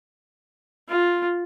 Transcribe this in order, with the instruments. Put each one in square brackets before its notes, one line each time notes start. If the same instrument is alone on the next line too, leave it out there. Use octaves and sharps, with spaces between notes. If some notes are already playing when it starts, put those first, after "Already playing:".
[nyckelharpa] F4